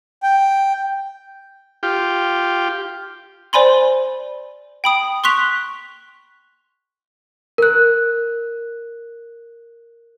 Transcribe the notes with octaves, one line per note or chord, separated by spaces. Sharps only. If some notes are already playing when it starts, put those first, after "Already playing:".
G5
F4 G4
C5 D5 G#5 B5 C6
G5 B5 D#6
C6 C#6 F#6 B6 F7
A#4 F#6